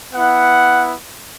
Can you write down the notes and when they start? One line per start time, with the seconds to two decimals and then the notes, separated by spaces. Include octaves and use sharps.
0.12 B3 E4 F#5